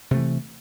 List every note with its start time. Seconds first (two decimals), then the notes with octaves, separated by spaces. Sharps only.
0.11 C3
0.14 A3
0.17 E3